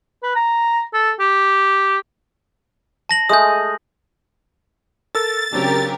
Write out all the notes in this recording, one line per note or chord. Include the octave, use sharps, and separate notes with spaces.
B4
A#5
A4
G4
A5 A#6 F#7
G#3 A3 G#4 D#6 G6
A4 A#4 E6 A6
C#3 F#3 C4 D4 G4 A#4